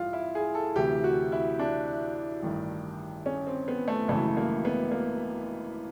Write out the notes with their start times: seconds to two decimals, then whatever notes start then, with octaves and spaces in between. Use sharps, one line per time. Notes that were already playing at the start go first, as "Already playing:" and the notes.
Already playing: A1 G2 E3 F4
0.13 E4
0.35 G#4
0.55 A4
0.76 D2 C3 E3 G4
1.04 F#4
1.32 E4
1.59 D4
2.43 A1 G2 D#3
3.26 C#4
3.47 C4
3.68 B3
3.88 A3
4.08 G#1 F#2 C#3 E3 A3
4.37 A#3
4.65 B3
4.92 A#3